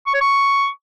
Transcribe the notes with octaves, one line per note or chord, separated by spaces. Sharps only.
C#6
C#5
C#6